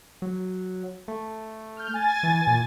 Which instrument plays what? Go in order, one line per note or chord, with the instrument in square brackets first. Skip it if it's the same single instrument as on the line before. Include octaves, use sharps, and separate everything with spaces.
[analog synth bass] F#3
A3
[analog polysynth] F6 G6
G#5 A6
[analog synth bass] E3
A#2